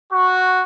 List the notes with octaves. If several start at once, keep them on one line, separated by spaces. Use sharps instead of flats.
F#4